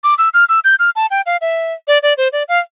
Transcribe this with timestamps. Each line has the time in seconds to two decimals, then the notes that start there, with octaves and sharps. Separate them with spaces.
0.04 D6
0.18 E6
0.34 F6
0.49 E6
0.64 G6
0.79 F6
0.96 A5
1.11 G5
1.26 F5
1.41 E5
1.88 D5
2.03 D5
2.17 C5
2.32 D5
2.48 F5